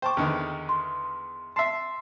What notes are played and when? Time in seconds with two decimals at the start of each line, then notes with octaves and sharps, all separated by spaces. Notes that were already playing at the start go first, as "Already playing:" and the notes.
0.02 C5 G5 A5 C#6 D6
0.17 E2 D3 D#3
0.69 C6
1.56 E5 A5 C6 C7